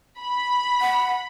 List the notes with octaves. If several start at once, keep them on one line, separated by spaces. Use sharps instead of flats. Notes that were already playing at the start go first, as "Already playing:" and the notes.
B5
F#5